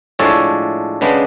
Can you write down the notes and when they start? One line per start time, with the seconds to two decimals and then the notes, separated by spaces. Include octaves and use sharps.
0.19 A2 F3 G#3 D4 A4 C#5
1.01 C#3 G#3 B3 D4